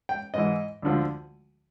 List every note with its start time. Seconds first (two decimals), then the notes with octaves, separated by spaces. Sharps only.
0.09 G5
0.34 G#2 E3 D#5
0.82 D2 D3 F3